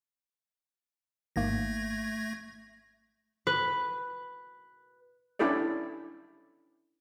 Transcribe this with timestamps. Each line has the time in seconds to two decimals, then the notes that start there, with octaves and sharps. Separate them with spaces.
1.36 G#1 G#2 A3 A#3 G#6 A#6
3.47 B4
5.39 C#4 D4 E4 G4 A4 D5